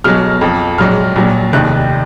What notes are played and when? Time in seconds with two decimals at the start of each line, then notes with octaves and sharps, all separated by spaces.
0.04 B1 B2 F#3 F6
0.41 F2 F3
0.78 A#1 G#2 F#3 F6
1.16 A#1 A#2 F#3
1.53 F1 D#2 D#3 F#6